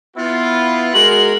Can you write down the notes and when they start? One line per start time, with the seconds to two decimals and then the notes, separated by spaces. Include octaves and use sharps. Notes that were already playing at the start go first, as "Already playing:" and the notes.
0.17 B3 E4 F4
0.94 G#3 F#4 A#4 F#7